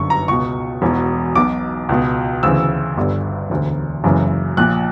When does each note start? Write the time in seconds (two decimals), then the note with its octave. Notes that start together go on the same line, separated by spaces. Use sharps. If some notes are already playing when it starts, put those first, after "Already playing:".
Already playing: G1 F#2 D3 C#6
0.10 A#5
0.28 C#2 B2 C#6
0.82 E1 E2 B2
1.35 B1 B2 D6
1.89 C#2 B2
2.43 D2 C#3 E3 E6
2.97 G1 G2 D3
3.50 E1 D2 D3
4.04 F#1 F#2 C#3 E3
4.57 A#1 A#2 F#6